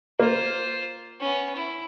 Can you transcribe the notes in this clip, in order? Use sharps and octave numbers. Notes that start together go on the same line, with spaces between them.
A#3 F4 C5
B3 C#4
E4